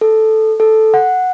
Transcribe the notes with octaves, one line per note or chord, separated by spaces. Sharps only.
A4
A4
F#5